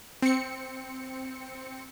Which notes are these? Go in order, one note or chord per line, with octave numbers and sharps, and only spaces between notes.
C4 C#7